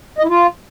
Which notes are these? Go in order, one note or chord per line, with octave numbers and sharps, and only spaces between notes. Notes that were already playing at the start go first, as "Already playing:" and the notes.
D#5
E4
F4